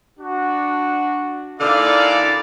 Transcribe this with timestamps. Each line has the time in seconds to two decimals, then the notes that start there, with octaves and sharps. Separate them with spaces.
0.18 D4 F#4
1.60 A#2 D3 D#4 E4 D5 F5